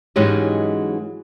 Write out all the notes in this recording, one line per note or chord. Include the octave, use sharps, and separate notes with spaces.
G#2 E3 F#3 G#3 C#4 G4